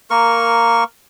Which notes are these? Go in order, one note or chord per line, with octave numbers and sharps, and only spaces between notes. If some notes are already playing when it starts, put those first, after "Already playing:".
A#3 A#4 C#6